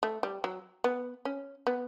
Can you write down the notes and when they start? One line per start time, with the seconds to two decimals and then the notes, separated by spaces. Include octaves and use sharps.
0.03 A3
0.23 G3
0.44 F#3
0.84 B3
1.25 C#4
1.67 B3